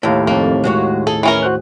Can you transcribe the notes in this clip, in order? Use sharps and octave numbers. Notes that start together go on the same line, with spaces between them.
D#2 A2 E4 G4 F5
F2 A#3
G#3 F#4 C#5
G#4 A4
E3 C#4 A#4 B5
F#4 C5 F#6